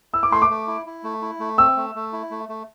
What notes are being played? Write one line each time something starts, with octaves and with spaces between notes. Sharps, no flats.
E4 E6
D6
A3 C6
D6
A3
E4
E4
A3
E4
A3
C4 E6
A3
A3
E4
A3
A3